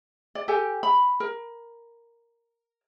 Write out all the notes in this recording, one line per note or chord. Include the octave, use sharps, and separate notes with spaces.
D5
G4 A4 G5 G#5
B5
A#4